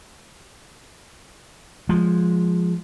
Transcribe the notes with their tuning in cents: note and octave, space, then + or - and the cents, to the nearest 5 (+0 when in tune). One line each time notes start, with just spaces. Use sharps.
F3 +10 G#3 +5